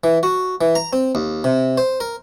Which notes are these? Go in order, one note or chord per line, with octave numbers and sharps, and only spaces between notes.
E3
F#4
E3
A#5
C4
D#2
C3
C5
A#4